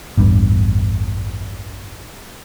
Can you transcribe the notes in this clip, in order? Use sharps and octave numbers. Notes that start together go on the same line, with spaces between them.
A1 E2 G2